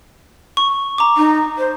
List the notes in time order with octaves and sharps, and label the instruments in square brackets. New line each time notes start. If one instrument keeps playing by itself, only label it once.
[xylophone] C#6
A#5 D6
[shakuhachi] D#4
C5